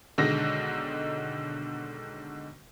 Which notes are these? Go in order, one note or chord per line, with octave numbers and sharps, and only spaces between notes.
B1 D3 D#3 G#3 D#4 A#6